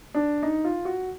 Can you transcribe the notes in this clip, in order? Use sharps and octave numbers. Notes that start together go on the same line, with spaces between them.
D4
D#4
F4
F#4